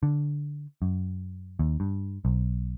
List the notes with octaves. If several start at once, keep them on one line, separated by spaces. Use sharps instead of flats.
D3
F#2
D#2
G2
B1